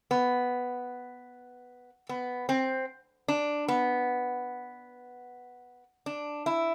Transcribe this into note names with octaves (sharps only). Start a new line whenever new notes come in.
B3
B3
C4
D4
B3
D4
E4